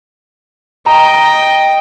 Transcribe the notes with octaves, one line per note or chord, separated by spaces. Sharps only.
D#5 G5 A#5